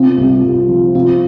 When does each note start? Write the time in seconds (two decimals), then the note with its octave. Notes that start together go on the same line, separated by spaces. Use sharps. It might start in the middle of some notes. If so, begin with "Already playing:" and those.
Already playing: C3 C4 F4
0.18 C2
0.43 C2
0.68 F3
0.95 C3 C4 F4